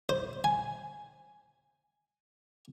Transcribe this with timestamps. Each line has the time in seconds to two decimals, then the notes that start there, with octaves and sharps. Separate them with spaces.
0.09 C5
0.44 G#5